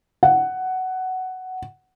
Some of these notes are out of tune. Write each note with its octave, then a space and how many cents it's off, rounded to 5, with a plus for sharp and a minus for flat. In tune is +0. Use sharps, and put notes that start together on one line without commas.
F#5 +10